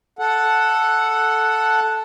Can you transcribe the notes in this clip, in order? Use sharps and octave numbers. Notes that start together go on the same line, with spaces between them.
A4 F#5